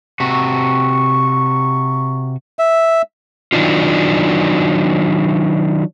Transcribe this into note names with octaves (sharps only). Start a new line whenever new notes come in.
C3 F#4 C#6
E5
D#3 F#3 D4 D#4 F4